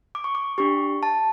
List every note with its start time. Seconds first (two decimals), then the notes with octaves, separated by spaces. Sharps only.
0.15 D6
0.24 C#6
0.35 D6
0.58 D4 G4 C#6
1.03 A5